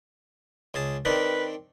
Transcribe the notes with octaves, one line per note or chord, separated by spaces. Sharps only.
C#2 G#4 A5
D#3 C4 D4 B4